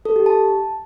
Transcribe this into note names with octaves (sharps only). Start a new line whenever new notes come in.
A4
G4
A5